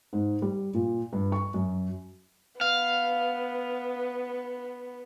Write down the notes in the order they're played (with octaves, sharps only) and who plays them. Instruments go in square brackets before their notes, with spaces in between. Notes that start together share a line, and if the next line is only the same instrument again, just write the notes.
[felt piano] G#2
G3
A#2
G2
C#6
F#2
[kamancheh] B3 [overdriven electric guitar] F5